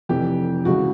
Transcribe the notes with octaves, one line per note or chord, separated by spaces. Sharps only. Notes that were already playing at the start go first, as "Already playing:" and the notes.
F1 F2 C3 E3 G4
C#2 C#3 E3 F#4